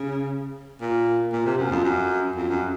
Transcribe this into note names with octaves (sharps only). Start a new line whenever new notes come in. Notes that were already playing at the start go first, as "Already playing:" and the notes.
Already playing: C#3
A#2
A#2
C3
F#2
F2
F#2
F2
F#2